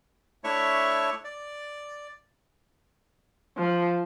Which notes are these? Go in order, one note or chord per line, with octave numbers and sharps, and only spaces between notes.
A3 D4 E4 C#5 E5 C#6
D5
F3